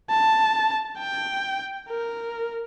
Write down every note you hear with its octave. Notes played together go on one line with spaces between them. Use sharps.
A5
G5
A#4